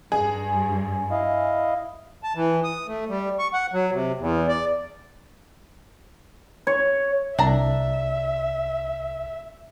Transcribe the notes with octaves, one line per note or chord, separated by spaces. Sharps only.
G2 G#4
E4 D#5 F5
A5
E3
D#6
A3
G3
C#6
F#5
F#3
C3
E2
D5
C#5
C2 D4 E5 A#5